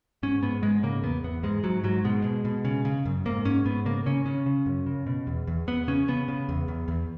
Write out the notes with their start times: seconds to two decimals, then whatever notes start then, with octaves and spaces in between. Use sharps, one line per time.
0.23 G#2 C#4
0.43 G#2 B3
0.63 G#2 G#3
0.83 C#3 A#3
1.03 E2 B3
1.24 E2 B3
1.43 G#2 G#3
1.63 G#2 F#3
1.84 G#2 F#3
2.05 B2 G#3
2.24 B2
2.45 B2
2.65 C#3
2.85 C#3
3.05 F#2
3.25 G#2 A#3
3.45 G#2 C#4
3.66 G#2 B3
3.85 C#3 A#3
4.06 C#3 C#4
4.26 C#3 C#4
4.46 C#3
4.66 F#2
4.87 C#3
5.07 B2
5.27 E2
5.48 E2
5.67 E2 B3
5.87 C#3 C#4
6.08 C#3 B3
6.28 C#3
6.49 E2
6.68 E2
6.88 E2